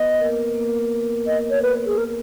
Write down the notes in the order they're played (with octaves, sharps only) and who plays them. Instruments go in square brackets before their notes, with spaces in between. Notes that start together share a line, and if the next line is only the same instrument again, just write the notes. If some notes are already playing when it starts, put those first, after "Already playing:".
Already playing: [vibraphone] B3 B4 [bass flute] D#5
[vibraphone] A#3 A#4
A#3 A#4
[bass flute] D#5
C#5
B4
G#4
A#4